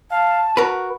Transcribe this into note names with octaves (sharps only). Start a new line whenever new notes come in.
F5 A5
F#4 A#4 B4